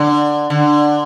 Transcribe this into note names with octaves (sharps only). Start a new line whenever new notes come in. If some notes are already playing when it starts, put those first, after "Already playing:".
Already playing: D3
D3